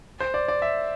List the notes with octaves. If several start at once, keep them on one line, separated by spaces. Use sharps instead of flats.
C5
D5
D5
E5